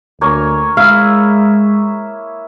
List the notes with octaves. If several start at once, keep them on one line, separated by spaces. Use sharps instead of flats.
D2 A#3 C#5 G#5
G#3 E4 F5 D#6